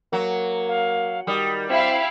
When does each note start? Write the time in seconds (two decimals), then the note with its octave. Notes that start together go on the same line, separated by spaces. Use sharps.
0.13 F#3 A#3
0.68 F5
1.27 D#3 G3 D#6
1.70 C4 E4 F5 G5